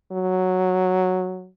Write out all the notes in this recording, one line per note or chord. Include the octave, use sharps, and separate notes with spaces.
F#3